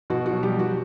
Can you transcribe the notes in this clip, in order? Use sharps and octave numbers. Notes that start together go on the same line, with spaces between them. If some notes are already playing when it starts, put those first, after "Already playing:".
B2 F#4
F#4
F#3
G3 G4
F#3
F#4